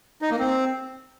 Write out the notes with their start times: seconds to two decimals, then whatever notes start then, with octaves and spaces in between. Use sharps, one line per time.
0.22 D#4
0.31 A#3
0.39 C4